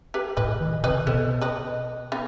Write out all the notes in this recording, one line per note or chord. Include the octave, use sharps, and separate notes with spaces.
G4 B4
A2 B4 D#5
D#3
C3 B4 D#5
B2 A4 C5
B4 D#5
B3 D#4